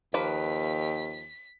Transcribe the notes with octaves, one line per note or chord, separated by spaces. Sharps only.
D#2 F3 A#3 B4 B6